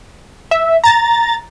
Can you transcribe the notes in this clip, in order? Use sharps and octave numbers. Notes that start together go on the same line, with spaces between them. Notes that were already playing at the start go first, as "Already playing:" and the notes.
E5
A#5 A6